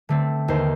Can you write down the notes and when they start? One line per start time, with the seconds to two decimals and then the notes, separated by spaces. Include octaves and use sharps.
0.09 D3 A3 C4
0.48 D#2 C5